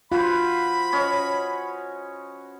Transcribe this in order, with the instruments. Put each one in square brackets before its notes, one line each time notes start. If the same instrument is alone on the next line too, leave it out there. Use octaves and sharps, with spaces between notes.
[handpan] F4 [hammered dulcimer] F#4 B4 C5 [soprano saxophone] B5
[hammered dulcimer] C#4 C#5 D#5